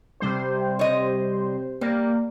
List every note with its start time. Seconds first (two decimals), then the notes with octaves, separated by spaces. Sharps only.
0.20 C3 G3 C5
0.79 C#5 D#5
1.81 G3 A#3